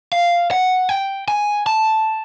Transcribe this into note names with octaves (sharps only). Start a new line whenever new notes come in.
F5
F#5
G5
G#5
A5